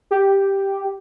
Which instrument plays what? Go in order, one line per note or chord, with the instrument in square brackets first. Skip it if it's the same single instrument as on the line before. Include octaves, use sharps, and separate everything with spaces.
[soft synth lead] G4